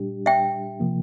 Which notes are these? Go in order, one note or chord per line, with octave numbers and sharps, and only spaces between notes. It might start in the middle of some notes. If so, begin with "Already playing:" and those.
Already playing: A#2 G3 D4 G4
E5 G5
C3 F3 A#3